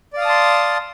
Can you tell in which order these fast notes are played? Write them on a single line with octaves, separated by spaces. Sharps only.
D5 F5 D#6 A5 C6